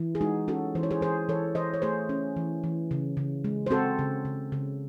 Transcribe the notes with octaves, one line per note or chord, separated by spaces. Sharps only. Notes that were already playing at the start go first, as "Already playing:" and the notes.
Already playing: E3
G#4
G#3 D#4 F#4
C#4 F#4 A4
E3 C5
C#5
G#4 C5
E3 G#4 C5
E3 A4 C#5
E3 C5 D#5
C#5
A3 G#4 C5
C#4
E3
E3
C#3
C#3
G#3
C5
C4 F#4 A4
C#3
C#3
C#3